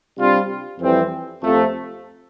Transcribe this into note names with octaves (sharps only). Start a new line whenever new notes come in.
C3 G3 D4 F4
F2 E3 G3 C4
F2 C3 F3 A3